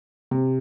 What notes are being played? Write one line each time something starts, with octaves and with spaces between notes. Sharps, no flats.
C3